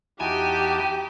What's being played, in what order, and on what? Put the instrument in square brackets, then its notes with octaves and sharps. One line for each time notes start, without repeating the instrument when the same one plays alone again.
[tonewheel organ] E2 E4 A5 [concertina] D#4 F#4 [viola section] G4 [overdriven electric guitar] G#5